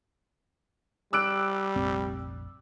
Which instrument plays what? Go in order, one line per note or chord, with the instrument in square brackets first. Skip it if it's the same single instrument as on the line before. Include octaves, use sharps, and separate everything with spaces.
[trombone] G3 [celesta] D6 [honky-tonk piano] E6 F#6 D7
[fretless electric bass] F1 A#1 C4